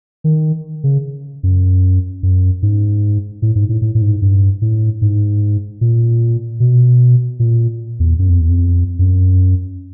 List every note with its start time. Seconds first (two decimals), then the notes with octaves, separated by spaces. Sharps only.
0.24 D#3
0.84 C#3
1.43 F#2
2.23 F#2
2.62 G#2
3.42 A2
3.56 G#2
3.69 A2
3.82 A2
3.95 A2
4.02 G#2
4.22 G2
4.62 A2
5.02 G#2
5.81 A#2
6.60 B2
7.40 A#2
8.00 E2
8.19 F#2
8.29 F2
8.39 E2
8.49 F2
8.99 F#2